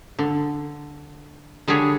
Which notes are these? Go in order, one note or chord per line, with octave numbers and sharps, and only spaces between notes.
D3
D3 G3 D4 G#4 C#5